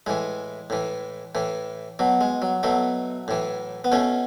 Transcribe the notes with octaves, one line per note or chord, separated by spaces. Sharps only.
A2 E3 G#3
A2 E3
A2 E3
B2 F#3
G#3
F#3
B2 F#3 A3
A2 E3
B3
B2 A3 C#4